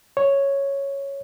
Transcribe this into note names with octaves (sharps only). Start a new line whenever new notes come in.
C#5